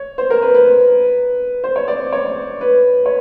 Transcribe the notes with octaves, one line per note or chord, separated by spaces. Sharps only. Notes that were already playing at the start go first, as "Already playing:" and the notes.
Already playing: C#5
C5
A#4
B4
B4
C5
C#5
D5
C#5
B4
C#5